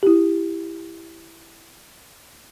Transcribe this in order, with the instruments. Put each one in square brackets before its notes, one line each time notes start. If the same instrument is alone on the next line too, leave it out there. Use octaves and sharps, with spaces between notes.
[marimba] E4 G4